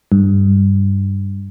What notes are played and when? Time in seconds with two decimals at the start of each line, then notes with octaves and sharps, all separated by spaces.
0.12 G2